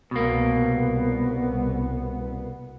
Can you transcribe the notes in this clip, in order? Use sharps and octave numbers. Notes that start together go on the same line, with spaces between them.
C2 B2 A#3 B3